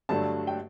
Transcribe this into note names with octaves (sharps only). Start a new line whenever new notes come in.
G2 D3 F#3 A3 D4 A5
G5